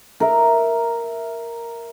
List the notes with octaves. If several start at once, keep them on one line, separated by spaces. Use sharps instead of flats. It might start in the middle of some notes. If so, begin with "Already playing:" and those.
A#4 E5